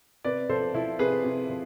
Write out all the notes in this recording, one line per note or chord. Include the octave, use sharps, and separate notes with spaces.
C3 B4 D5
F3 A4 C5
F3 E4
C3 G#4 B4
C3
F3